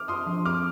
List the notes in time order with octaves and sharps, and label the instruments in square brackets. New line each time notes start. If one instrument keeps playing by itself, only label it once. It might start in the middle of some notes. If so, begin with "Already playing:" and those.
Already playing: [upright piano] D6 F6
[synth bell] F4 [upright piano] C6 D#6
[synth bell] F3
[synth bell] C4 [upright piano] D6 F6